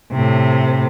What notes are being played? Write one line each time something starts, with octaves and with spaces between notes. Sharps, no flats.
A2 C3